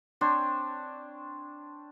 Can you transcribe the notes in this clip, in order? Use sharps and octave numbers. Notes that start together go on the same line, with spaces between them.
C4 D4 C5 C#5